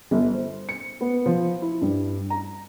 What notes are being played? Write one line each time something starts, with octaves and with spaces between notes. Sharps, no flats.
G1
C5
C#7
B3
F3
E4
G2
A#5